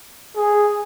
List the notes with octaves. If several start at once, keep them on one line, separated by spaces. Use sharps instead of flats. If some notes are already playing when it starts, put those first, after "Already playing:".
G#4